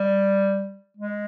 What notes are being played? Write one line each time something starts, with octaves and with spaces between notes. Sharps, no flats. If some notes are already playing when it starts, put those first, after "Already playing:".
Already playing: G3
G#3